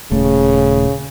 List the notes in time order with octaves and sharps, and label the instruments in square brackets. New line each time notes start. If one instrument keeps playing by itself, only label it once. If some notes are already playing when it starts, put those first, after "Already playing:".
[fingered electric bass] D#1 A3 [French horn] C#3